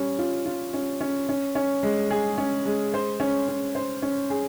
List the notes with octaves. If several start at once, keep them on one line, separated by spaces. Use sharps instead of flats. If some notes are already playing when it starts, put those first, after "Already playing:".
Already playing: G3 C#4
F4
F4
C#4
C#4
C#4
C#4
G#3
G#4
C#4
G#3
C5
C#4
C#4
C5
C#4
G#4